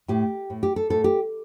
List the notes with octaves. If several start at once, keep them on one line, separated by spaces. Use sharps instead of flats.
A2 G4
A2
G4
A4
A2 A4
G4